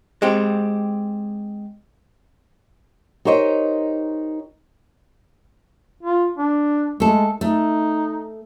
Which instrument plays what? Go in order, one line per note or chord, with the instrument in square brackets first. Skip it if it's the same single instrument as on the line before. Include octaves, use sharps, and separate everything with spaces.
[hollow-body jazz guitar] G#3 C4 G4
[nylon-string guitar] D#4 G4 A#4 C5 C#5 D#5
[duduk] F4
D4
[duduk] G#3 [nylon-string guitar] A3 A4
[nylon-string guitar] A3 [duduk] D#4